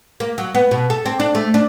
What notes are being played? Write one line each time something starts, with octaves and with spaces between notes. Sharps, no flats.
A#3
F#3
B3
B2
A4
C4
D4
A3
D4